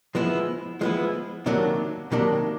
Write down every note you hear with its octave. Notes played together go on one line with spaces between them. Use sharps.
F3 G#3 B3 E4
F3 G#3 B3 E4
C3 D#3 F#3 A#3 D4
C3 D#3 F#3 A#3 D4